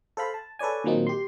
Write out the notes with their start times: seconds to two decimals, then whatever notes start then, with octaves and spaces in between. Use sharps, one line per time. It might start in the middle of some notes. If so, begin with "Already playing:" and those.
0.17 A4 C5 F5 B5
0.34 A5
0.59 A4 B4 C#5 D5 G#5
0.84 A#2 D#3 F#3 A#3 C4 D#4
1.07 G4 C6